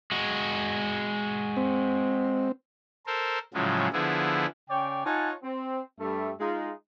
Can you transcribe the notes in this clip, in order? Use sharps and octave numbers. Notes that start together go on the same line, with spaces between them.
G#3 F#4
C4
A4 A#4 C5
A2 C#3 F3 F#3 G#3
D3 F3 B3 E4 G#4
C#3 C#5 D5 G5
D#4 F4 C#5 F#5 G#5 A5
C4
G2 G3 A3 A4 E5
G#3 D#4 F4